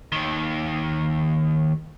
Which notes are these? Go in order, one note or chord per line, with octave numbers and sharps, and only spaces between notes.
D#2 D#3